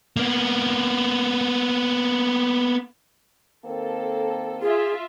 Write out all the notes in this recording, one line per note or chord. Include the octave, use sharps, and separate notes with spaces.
A#3 B3
D#3 A#3 C4 A4
F4 G#4 E5